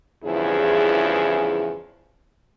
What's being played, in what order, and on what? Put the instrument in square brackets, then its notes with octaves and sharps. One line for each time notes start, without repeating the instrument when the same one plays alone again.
[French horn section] E2 G2 C#3 F3 E4 G#4